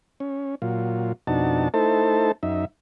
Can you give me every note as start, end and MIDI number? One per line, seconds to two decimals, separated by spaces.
0.20 0.55 61
0.62 1.12 46
0.62 1.12 54
0.62 1.12 65
1.27 1.68 41
1.27 1.68 47
1.27 1.68 62
1.27 1.68 63
1.27 1.68 66
1.27 1.68 81
1.74 2.32 57
1.74 2.32 63
1.74 2.32 64
1.74 2.32 69
1.74 2.32 72
1.74 2.32 81
2.43 2.65 42
2.43 2.65 63
2.43 2.65 76